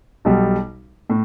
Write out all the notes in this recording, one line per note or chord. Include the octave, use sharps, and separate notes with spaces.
B1 B2 G3
A2